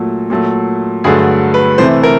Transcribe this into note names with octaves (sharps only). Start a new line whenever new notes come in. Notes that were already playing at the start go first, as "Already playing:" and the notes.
Already playing: A#2 F#3 A3
A#2 F#3 A3
G2 D3 F#3 A3 G#4
B4
C3 E3 A3 C5
A#4